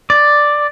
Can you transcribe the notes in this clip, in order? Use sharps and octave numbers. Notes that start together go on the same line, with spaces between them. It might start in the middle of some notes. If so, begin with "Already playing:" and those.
D5